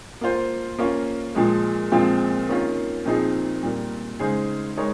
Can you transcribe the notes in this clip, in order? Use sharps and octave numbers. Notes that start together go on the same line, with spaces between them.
A#3 F4 C5
A#3 C#4 F4
A#2 F3 G#3
A#2 F3 G#3 C4 F4
D#3 A#3 C#4 F4
A#2 F3 C4 D#4 G#4
A#2 G3 A#3
C#3 G#3 D#4 G#4 C5
G#3 D#4 A#4 C#5